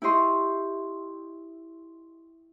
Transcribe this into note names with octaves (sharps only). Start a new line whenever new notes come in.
E4 G4 D#5 C6 C#6